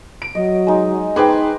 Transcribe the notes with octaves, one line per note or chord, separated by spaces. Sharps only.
D7
F#3 D#5
G#3 D#4
D#4 G#4 B4 C5 D#5 G5 D6